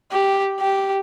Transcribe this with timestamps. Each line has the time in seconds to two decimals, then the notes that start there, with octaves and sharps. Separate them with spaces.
0.12 G4
0.60 G4